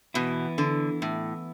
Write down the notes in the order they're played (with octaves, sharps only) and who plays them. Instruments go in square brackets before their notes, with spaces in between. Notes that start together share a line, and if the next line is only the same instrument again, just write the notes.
[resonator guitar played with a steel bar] B2 [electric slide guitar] E3 B3 E4
[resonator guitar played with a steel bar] D3
A2